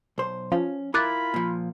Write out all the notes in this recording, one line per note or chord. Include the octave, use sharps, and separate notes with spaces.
B1 C5
F3 C#4
E4 F4 A#4 B5 D6 F#6 A6
A#2 F3